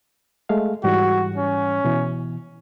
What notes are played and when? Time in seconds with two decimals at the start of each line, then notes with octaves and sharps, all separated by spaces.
0.49 G#3 A3 F5
0.84 G#2 E3 G3 F#4
1.36 C#4
1.85 B2 E3